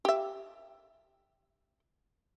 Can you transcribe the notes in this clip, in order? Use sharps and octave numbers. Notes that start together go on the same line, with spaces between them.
G4 E5